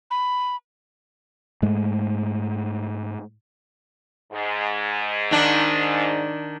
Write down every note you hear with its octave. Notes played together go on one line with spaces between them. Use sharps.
B5
G#2 G#3 A3
G#2
D#3 D4